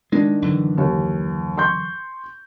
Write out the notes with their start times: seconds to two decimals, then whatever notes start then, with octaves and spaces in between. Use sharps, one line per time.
0.12 D#3 G#3 D4
0.42 F#2 D3 E3
0.78 D#2
1.57 C6 C#6 G6